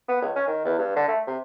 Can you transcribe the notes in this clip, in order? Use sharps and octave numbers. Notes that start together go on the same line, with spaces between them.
B3
C#2
C#4
D#3
E2
G2
D3
A3
C3